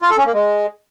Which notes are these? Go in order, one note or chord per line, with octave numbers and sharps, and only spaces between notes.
F4
A4
C#4
A#3
G#3